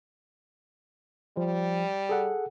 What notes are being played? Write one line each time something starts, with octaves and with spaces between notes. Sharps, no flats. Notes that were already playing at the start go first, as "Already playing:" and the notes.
F3 G3
G#4 A4 F#5